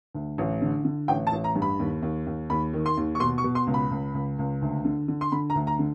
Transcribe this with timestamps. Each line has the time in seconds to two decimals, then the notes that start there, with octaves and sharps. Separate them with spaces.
0.15 D2
0.38 A1
0.62 D3
0.85 D3
1.08 A1 G5
1.27 A5
1.32 A1
1.44 A#5
1.55 G2
1.62 B5
1.79 D#2
2.02 D#2
2.27 D#2
2.50 D#2 B5
2.73 D#3
2.86 C6
2.97 D#2
3.15 C#6
3.20 B2 C6
3.38 C#6
3.44 B2
3.55 C6
3.67 C#2
3.74 B5
3.91 C#2
4.14 C#2
4.39 C#2
4.62 D2
4.85 D3
5.08 D3
5.21 C6
5.32 D3 B5
5.50 A#5
5.55 D2
5.67 A#5
5.79 D3